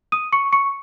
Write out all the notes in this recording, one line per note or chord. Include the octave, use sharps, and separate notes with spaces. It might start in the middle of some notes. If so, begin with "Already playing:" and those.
D#6 D#7
C#6 C#7
C#6 C#7